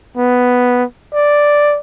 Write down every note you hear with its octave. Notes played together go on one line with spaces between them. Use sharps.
B3
D5